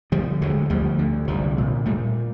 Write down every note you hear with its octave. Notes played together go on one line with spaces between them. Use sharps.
D3 F3 G3
D2 F#3 G#3
D2 F3 G3
D3
C2 F3 G3
A#2
A#2 G3 A3